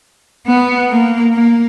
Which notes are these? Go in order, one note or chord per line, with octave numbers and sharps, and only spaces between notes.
B3
A#3
A#3